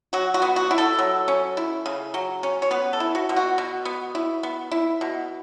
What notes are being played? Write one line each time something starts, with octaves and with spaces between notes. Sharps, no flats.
F#3 F#4
F#4
B3
F#4
E4
A4
F#3
C#4
E4
C#3
F#3
C#4
C#5
B3 B4
A4
E4
F#4
B2
F#4
B2
B3
E4
B3
E4
B2